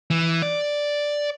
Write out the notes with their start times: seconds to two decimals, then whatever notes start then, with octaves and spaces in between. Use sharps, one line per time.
0.10 E3
0.42 D5